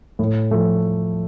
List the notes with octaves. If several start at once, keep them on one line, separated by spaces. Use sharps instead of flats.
A2
F3 A3